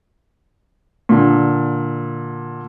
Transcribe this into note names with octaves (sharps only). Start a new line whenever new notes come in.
A#2 D3